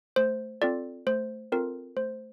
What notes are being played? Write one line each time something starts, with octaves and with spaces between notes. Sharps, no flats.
A3 C5
C4 F4 A4 D5
A3 C5
C4 F4 A4 A#4
A3 C5